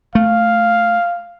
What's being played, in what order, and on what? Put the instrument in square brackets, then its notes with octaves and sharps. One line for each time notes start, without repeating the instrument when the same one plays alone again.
[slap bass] A3 [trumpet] F5